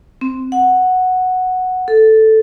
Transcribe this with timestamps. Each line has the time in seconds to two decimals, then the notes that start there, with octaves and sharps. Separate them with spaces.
0.21 C4
0.52 F#5
1.88 A4